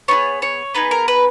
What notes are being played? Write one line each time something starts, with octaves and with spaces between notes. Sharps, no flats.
B3 D#4 G#4 C#5
C#5
B3 D#4 G#4 B4
A#4
B4